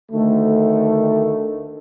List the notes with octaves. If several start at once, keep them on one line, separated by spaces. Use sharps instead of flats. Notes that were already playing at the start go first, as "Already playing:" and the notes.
D2 D#3 A3